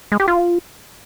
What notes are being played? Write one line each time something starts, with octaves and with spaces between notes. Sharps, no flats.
G#3
G4
F4